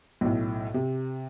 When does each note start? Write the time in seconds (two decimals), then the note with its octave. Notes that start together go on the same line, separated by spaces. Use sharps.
0.21 B1 A2
0.74 C3